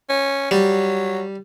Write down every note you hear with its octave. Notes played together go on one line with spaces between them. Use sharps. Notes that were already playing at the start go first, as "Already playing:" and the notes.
C#4
F#3 G3